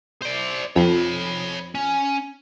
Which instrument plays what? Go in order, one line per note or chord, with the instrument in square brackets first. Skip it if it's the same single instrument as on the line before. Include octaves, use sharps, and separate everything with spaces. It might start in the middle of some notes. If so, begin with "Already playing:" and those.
[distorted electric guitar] C5 D5
[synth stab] F2 [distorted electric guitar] C#5 B5
[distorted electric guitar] C#4